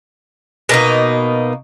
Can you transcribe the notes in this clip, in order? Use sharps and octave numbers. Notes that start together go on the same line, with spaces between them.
B2 A#3 D#4